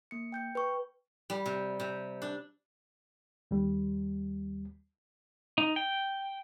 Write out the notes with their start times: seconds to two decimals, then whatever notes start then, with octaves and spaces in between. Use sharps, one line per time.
0.11 A#3 C#7
0.32 G5 G6 C#7
0.55 B4 G5 C#6
1.30 G3
1.46 C3
1.80 C3
2.22 D4
3.51 D#2 G3
5.58 D#4
5.76 G5